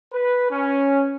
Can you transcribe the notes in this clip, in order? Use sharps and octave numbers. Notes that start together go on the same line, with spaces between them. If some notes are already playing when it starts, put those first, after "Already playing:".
B4
C#4